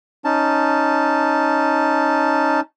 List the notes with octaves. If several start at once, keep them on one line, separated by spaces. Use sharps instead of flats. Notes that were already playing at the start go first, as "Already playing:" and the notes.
C#4 D#4 A5